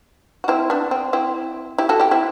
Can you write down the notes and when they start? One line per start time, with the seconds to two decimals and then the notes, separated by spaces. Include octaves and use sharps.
0.44 F#4
0.48 C4 E4
0.70 B3 D4
0.91 C4
1.13 C4 E4
1.78 E4 G4
1.89 F#4 A4
2.00 E4 G4
2.11 C4 E4